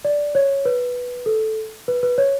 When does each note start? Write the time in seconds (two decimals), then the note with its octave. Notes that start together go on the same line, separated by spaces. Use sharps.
0.05 D5
0.35 C#5
0.65 B4
1.26 A4
1.88 B4
2.03 B4
2.18 C#5